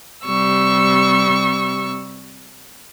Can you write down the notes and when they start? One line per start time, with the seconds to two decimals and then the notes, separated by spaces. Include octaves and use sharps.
0.25 C3 G3 C#6 E6